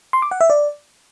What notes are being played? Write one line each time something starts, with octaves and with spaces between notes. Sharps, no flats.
C6
D6
F#5
E5
D5